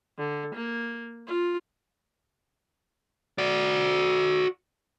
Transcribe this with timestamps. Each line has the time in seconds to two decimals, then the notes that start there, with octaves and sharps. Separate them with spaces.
0.18 D3
0.55 A#3
1.27 F4
3.38 F#4 D5